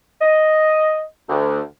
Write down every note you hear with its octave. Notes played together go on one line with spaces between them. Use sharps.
D#5
D2